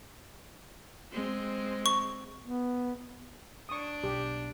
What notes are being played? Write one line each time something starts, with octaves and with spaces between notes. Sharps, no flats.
G#3 C4
C#6
B3
D4 C#6 D#6
B1 G4